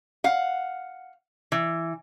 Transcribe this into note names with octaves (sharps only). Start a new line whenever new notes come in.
F5 F#5
E3